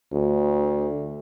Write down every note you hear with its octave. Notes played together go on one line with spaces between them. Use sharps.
D2